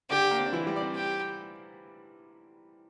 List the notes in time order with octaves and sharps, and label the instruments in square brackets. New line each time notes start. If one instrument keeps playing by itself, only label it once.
[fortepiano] D3 D4 [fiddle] G4
[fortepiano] A#3
C4
D4
E3 E4
G3 G4
D5
C4 C5
[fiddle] G4